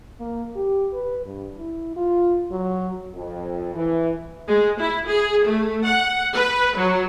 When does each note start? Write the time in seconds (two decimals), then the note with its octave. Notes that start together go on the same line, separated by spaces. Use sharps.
0.20 A#3
0.56 G4
0.93 B4
1.25 G2
1.58 E4
1.96 F4
2.51 F#3
3.14 F2
3.75 E3
4.48 G#3
4.80 E4
5.08 G#4
5.45 A3
5.85 F#5
6.34 B4
6.77 F#3